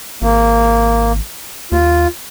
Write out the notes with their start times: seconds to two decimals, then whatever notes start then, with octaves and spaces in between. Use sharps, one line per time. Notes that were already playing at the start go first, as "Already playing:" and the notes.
0.22 G#1 A#3
1.72 D#2 F4